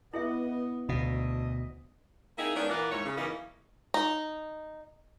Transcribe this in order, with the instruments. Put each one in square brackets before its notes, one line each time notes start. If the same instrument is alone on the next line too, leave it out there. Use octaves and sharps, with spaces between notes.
[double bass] B3 [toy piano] E4 G#4 E5 [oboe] D#5
[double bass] D2 [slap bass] B2 [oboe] D#5 [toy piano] F5 B5
[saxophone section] A#3 C4 D#4 E4 G#4
D#3 G#3 B3 C#4 D4
A#2 E3 A#3 A#4 D5 F#5
D#2 G#2 E4 C#5
C#3
F#2 E3 A#3 B3 C#4 D#4
[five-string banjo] D#4